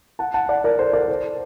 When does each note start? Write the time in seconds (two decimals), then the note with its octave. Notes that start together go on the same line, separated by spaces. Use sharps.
0.19 F#5 A5
0.34 F#5 A5
0.49 D5 F#5
0.64 A#4 D5
0.79 A4 C5
0.93 A#4 D5
1.08 A4 C5